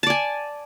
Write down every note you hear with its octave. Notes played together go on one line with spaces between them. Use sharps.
D5 G#5 A5